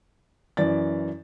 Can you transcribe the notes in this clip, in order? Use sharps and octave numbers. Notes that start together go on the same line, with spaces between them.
F#2 E3 D5 A6